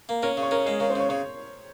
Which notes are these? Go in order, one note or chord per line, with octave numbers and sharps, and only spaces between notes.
A#3
C#4 A#4
C#3
C#5
C#4 A#4
G#3 G#4
C#3 A#4
C5
C#3 C#5
C#3 C#5